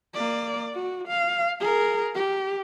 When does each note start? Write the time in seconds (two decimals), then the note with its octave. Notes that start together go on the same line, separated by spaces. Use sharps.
0.14 A#3 D5
0.74 F#4
1.08 F5
1.60 G#4 A#4
2.15 G4